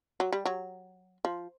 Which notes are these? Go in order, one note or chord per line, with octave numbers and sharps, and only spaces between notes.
F#3
G3
F#3
F3